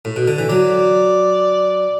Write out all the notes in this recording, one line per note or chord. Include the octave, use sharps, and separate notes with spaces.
A2
B2
D3
E3
F#3 D5